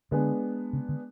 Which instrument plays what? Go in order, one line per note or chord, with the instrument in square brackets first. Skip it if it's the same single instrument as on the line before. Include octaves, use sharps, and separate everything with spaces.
[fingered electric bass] D3 [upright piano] G#3 B3 D4 G#4
[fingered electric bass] C#3
D3